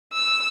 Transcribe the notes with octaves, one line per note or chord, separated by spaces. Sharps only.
E6